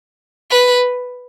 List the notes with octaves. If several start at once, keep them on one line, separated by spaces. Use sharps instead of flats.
B4